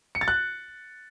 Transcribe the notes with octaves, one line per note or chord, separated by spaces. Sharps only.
C#7
A6
F#6